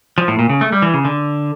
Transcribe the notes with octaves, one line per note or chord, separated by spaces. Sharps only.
F3
A2
A#2
C#3
A3
G3
E3
C#3
D3